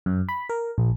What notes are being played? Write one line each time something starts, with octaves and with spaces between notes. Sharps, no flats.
F#2
B5
A#4
A#1